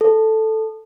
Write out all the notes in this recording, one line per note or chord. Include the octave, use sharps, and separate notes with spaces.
A4